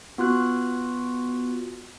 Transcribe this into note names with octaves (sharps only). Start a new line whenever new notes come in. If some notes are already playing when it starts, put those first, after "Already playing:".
B3 F4 F#4 F#6